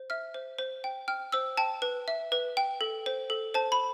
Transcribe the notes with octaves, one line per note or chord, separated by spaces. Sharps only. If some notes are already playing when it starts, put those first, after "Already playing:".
Already playing: C5
E5 F6
C5
C5
G5
G5 F6
C5 E6
G5 A5
B4
E5
B4
G5
A4
C5
A4
C5 A5
B5